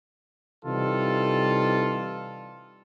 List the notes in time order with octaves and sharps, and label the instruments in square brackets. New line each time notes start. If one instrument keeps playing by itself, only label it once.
[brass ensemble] C3 E3 G3 D#4 F4 A4